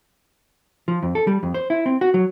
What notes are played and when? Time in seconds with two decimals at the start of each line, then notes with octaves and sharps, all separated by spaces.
0.88 F3
1.03 F2
1.15 A4
1.27 G3
1.43 F2
1.54 C5
1.70 E4
1.86 C4
2.01 F#4
2.14 F#3